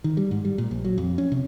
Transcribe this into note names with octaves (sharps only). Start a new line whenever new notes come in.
D#3
G3
G#2
G3
A#2
A#1
F#3
F2
C#4
C3